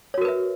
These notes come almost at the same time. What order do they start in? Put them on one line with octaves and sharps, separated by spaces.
C#5 F#4 A#4 B4 E5